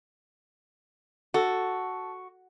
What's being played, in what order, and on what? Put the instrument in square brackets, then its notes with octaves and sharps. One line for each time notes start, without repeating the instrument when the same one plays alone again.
[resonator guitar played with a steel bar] F#4 [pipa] A4